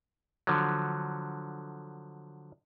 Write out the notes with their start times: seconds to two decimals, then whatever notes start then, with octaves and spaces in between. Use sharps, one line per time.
0.47 D3 F3 F#3